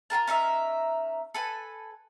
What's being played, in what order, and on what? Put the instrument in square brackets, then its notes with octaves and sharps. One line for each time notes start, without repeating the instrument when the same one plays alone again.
[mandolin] F4 G#4 A#4 A5
C#4 D#4 A#4 E5
A4 B4 G#5